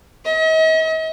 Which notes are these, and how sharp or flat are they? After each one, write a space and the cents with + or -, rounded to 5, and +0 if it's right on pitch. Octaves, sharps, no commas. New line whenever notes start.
D#5 +45